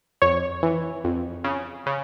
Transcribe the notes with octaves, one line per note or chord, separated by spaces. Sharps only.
F2 C#5
E3
F2
C#3
C#3